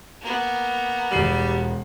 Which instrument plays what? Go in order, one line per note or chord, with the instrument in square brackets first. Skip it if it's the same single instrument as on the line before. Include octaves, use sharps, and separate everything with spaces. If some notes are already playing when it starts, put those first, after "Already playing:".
[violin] A#3 B3
[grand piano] E1 C7 F#7 [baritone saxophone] G3